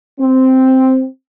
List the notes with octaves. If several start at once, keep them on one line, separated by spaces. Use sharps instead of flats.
C4